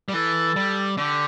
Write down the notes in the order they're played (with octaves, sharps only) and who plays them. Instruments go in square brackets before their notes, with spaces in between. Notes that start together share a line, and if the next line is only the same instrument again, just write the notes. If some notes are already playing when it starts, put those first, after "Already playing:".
[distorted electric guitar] G3
[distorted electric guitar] E3 [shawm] A4
[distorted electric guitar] G3
[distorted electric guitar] D3 [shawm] G4